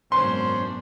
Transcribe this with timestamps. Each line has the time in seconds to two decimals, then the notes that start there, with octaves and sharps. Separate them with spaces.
0.12 G#1 F#2 B2 C#4 D4 C5 C6